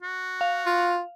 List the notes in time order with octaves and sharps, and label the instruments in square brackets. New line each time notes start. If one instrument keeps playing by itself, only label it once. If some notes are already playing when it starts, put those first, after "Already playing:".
[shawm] F#4
[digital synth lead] F5
[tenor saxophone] F4